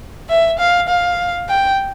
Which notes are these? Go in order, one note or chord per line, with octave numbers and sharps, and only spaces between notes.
E5
F5
F5
G5